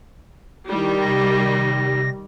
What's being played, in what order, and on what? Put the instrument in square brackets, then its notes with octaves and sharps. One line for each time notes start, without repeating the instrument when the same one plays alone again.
[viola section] D#3 G3 [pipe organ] E4
[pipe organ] C3 A#6